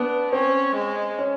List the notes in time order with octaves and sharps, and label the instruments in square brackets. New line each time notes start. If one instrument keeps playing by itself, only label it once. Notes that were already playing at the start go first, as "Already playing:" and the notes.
Already playing: [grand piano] B3 [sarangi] D4
[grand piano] C4 [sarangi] C#4
[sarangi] G#3
[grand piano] C#4